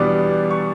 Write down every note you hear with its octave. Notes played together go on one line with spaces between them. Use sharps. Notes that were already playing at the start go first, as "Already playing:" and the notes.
Already playing: E2 B2 G3 B3 D4 D6
C#6